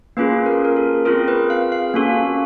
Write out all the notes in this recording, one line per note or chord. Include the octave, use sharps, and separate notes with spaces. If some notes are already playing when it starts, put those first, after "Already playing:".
A#3 C#4 F4 G#4 B4
A#4
A#4
A4
C4 F4 G#4 A#4
B4
F5
F5
A#3 C#4 F#4 A4